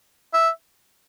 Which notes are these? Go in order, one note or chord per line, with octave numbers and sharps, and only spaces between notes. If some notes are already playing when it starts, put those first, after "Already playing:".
E5